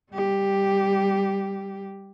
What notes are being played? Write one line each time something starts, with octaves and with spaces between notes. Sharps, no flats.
G3 G4